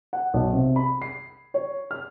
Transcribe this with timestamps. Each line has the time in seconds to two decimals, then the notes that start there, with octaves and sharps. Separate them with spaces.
0.13 F#5
0.34 B1
0.53 C3
0.76 B5
1.02 C7
1.54 C#5
1.91 F6